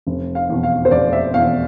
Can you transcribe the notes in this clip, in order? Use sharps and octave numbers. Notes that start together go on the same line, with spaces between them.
F1
F5
E2 B2
F5
C5
F1 D5
E5
E2 B2 F5